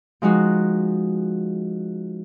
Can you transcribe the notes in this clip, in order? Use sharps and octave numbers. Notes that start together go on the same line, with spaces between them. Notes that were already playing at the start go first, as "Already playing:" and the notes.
F3 G#3 D#4 F#4